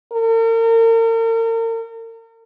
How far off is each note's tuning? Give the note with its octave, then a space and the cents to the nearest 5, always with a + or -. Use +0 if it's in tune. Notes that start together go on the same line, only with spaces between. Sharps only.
A#4 -40